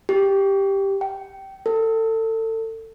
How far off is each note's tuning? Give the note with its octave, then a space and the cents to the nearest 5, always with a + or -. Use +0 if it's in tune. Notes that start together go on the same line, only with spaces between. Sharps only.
G4 +0
G5 -15
A4 +30